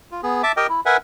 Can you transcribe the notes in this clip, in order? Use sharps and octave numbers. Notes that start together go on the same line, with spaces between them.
F4
B3 G#4
E5 A5 D6
G4 A#4 D#5 G5
E4
A#4 B4 E5 F#5 G#5